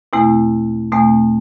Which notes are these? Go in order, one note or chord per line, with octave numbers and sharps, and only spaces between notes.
E2 B2 A3 C4 E4
E2 B2 A3 C4